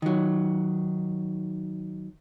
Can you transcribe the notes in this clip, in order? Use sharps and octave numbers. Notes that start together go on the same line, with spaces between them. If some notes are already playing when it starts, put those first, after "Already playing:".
D#3 F#3